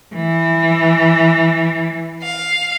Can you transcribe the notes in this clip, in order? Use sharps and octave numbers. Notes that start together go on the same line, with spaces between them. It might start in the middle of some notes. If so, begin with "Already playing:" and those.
E3
F5